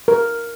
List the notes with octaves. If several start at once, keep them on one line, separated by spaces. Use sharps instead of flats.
A#4